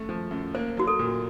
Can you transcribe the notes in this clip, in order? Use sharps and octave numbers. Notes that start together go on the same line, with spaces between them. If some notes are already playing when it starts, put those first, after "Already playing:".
Already playing: F#2 A3
F3
F#2
A#3 C5
F#3 F#4
A4
A#2